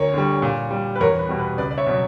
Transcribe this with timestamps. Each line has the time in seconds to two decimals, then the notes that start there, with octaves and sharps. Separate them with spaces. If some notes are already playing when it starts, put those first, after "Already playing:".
Already playing: D2 A#4 C#5
0.13 D3 G3
0.42 A#2
0.71 G3
0.96 B4
1.00 E2 A#4 C#5
1.19 B4
1.29 B2 G3
1.39 B4
1.58 C#2 B4 D5
1.71 D5
1.78 C#5 E5
1.86 B2 F#3